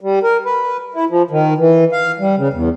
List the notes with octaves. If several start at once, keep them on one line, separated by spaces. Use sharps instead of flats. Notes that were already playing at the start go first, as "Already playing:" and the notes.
G3
A#4
B4
E4
F3
D#3
E3
F5
G3
C#3
E2